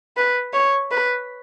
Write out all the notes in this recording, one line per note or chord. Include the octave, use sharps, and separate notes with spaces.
B4
C#5
B4